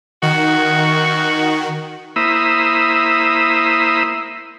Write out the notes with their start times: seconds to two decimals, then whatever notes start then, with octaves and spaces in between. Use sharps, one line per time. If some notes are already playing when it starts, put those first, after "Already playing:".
0.23 D#3 F#4
2.16 A#3 E4 C5 E5 B5 D#6